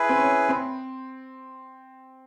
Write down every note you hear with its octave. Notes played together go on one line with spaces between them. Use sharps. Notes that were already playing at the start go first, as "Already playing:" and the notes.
Already playing: E4 G#4 B4
C4
C#4
C4